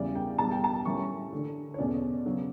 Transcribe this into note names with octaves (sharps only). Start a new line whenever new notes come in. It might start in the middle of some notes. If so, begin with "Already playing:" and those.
Already playing: E2 C#3 E3 G3 D5
G5
E2 B2 G3 A5
G5
A5
A2 E3 G3 C#4 C#6
D3 A3 D4
C#5
E2 B2 A3 C#4 D5
C#3 F#3 B3